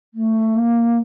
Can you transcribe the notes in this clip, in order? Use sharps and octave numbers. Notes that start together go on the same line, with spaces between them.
A3
A#3